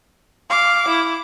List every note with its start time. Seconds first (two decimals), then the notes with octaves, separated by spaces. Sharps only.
0.50 F5 D6
0.88 E4